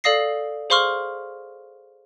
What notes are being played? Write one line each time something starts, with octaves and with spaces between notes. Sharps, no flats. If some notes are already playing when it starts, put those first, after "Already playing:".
A4 D5 F5 D#6 A#6 C7
G#4 C5 F5 C6 C#6 F6